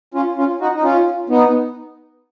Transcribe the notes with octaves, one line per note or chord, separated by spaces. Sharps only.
C#4 F4
C#4 F4
D#4 F#4
D#4
C#4 F4
B3 D#4